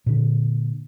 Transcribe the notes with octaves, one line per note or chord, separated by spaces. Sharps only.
A#2 D3